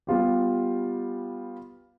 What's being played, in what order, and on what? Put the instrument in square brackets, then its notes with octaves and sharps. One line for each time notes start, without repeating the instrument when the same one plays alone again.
[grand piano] G3 B3 F4 G4